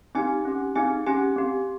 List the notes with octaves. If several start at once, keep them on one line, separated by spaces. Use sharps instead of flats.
C4 D#4 G4 G#5
C#4 G4
C4 D#4 G#4 G#5
C#4 G4 G#5
C4 G4